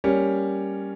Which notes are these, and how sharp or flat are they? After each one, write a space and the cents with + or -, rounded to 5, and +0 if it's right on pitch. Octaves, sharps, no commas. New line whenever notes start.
G3 +0 A#3 +0 C#4 +0